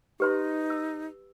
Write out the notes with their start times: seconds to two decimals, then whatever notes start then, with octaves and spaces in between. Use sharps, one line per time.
0.20 D#4 G4 B4 C6
0.70 E6